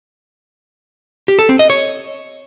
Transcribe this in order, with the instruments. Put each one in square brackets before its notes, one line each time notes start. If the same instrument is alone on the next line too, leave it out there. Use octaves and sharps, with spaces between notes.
[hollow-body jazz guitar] G4
A4
C4
D#5
C#5